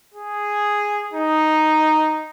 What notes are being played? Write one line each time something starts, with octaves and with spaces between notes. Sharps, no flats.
G#4
D#4